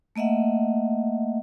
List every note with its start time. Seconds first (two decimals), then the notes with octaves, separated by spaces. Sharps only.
0.16 A3 A#3 D#5 E5 F#5